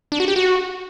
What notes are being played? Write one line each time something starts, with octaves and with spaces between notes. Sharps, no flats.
D4
F#4
G4
F#4